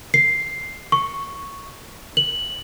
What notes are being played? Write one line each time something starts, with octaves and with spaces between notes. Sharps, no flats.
C7
C#6
F#7